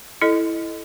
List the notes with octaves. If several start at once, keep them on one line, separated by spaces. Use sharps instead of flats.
E4 A4 D#5